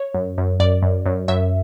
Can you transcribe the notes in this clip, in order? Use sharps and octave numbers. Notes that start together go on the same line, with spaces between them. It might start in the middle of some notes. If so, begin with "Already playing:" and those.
Already playing: C#5
F#2
F#2
F#2 D5
F#2
F#2
F#2 E5